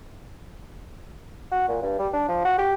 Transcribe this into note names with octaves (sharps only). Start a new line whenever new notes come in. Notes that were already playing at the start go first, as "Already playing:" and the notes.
F#4
A#2
G2
G3
D4
F3
F#4
G4